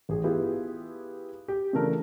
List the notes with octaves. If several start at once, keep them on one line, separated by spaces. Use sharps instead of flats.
A1 G#4
B3 E4 F4 G4 G#4
G4
C#3 E3 A3 D4 A#4